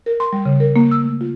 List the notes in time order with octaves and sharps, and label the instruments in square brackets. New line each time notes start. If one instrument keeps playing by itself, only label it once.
[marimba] A#4
C6
G3
C#3
A#4
A#3
E6
A3
F4